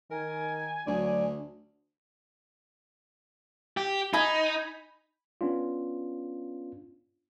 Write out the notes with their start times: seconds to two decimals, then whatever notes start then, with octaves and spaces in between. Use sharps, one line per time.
0.11 D#3 A#4 G#5
0.87 D2 F#3 D5
3.77 G4
4.13 D#4 G#5 B5
5.41 B3 C#4 D4 F4